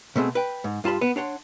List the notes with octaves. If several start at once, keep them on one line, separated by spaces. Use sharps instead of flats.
B2 A3 C4 G#4
B4 G5
G#2
G2 F4 A5 B5 C6
B3
D4 C#5 F#5 C6